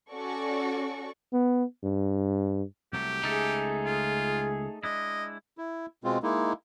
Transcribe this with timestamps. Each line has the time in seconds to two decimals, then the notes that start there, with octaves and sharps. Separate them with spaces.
0.11 C#4 F#4 A4 D5 C#6
1.33 B3
1.84 G2
2.93 C2 F#3 A3 G4
3.23 C#2 A3 D#4 G#4 A4 E5
3.86 F4
4.83 G#3 D4 E4 D#5
5.58 E4
6.04 B2 G#3 C4 F4
6.23 G#3 A#3 D#4 E4